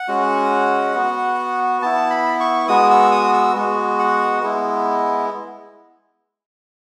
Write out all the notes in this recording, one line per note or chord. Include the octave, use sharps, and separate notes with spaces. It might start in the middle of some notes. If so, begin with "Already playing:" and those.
Already playing: F#5
G#3 C#4 F#4
B3 F#4
B3 E4 A5
B5
C#6
G#3 B3 F#4 D#6
E6
D#6
E6
G#3 B3 F#4
F#5
G#3 B3 E4